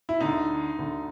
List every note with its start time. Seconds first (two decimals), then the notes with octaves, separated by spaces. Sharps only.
0.09 E4
0.20 D2 D3 D#4
0.79 D2 D3